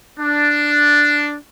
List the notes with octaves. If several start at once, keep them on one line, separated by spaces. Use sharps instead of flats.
D4